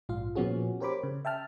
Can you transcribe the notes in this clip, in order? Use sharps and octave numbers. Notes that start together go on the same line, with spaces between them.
A#1 G#2 F4 F5
A#2 F3 B3 C#4 F#4 G#4
G4 A#4 C5 C#5 B5 D6
C#3
E5 G5 A5 F6